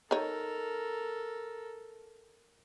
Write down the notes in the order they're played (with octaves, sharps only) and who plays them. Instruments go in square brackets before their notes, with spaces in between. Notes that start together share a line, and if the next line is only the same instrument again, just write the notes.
[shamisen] D#4 C#5 [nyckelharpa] A4 A#4